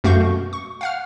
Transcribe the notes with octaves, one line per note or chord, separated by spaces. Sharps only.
F#2 A3 F#4 F5 C#6 G6
B2
C#6
F5 F#5 F6